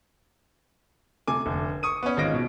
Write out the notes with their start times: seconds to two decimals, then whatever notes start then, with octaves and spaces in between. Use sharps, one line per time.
1.28 C3 A3 G#5 D6
1.46 F1 D3 A4
1.83 C#6 D#6 D#7
2.03 B3 C#4
2.17 G#1 G#3 F4 A#6 D7
2.34 B2